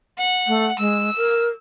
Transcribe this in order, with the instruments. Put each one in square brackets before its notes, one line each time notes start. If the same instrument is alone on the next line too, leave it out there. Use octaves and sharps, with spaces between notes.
[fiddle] F#5
[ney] A3
[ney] G#3 [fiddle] E6
[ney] A#4